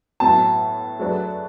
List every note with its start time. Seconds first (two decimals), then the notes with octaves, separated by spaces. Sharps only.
0.20 A2 F#3 B3 A5
0.99 F#3 A3 D4 G#4 B4